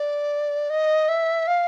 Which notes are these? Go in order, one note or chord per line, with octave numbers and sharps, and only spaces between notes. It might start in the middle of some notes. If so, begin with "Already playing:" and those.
Already playing: D5
D#5
E5
F5